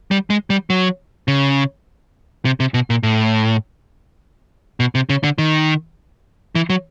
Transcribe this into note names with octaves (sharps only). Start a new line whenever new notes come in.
G3
G#3
G3
F#3
C#3
C3
C3
B2
A#2
A2
B2
C3
C#3
D3
D#3
E3
F#3